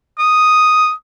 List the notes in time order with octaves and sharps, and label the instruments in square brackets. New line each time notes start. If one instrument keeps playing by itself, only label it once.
[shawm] D#6